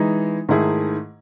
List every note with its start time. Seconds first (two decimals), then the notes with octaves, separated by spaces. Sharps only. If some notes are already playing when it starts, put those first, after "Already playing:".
Already playing: E3 G#3 D#4
0.49 G#2 D#3 A3 E4 G#4